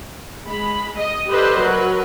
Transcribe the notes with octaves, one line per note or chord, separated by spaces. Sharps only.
G#3 B5
D#5
G4 A4 B4 C5 D5 D#5
F#3 A#4 B4